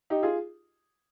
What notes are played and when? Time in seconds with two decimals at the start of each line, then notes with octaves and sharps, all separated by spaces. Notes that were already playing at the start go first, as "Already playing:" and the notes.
0.10 D#4 G4
0.23 F4 G#4